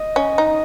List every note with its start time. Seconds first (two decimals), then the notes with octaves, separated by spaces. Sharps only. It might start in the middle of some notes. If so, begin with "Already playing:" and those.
Already playing: D#5
0.16 C#4
0.38 D#4